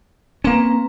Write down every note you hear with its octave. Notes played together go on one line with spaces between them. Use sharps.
A#3 C4 C#4 B4 A#5